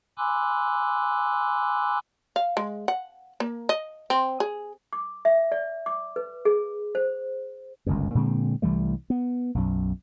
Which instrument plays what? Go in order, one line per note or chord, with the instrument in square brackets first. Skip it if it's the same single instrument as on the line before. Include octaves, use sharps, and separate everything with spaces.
[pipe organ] G#5 B5 C6 D6 E6 F#6
[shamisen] F5
G#3
F#5
A#3
D#5
C4
G#4
[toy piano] D6
E5
D5
D6
B4
G#4
C5
[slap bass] G1 C#2 F#2
A#2 D3 G#3 C4
C2 E3 G3 A3
B3
B1 F#2